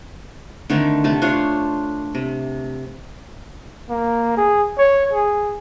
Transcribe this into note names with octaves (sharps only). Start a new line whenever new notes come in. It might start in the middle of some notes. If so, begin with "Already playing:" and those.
D3 D#3 A3 C4
C3 A3 A5
D4 F4 C5 C#5
C3
A#3
G#4
C#5
G#4